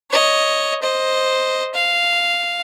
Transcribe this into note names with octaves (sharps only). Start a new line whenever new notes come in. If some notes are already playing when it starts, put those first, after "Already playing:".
C#5 D#5
C5 D#5
F5